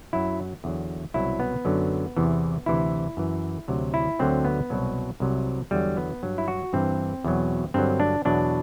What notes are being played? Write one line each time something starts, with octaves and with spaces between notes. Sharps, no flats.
F#2 F#3 E4
E2 D3 F#3
C2 B2 F#3 E4
B3
F#2 D3 F#3
E2 C3 E3
D2 C3 E3 E4
F#2 E3
D2 C3 F#3
E4
D2 D3 F#3 C4
B3
C2 B2 F#3
C2 C3 F#3
E2 D3 F#3 G3
B3
G2 F#3
E4
F#4
G2 E3 C4
E2 B2 F#3
G2 D3 F#3 C4
D4
E2 B2 F#3 D4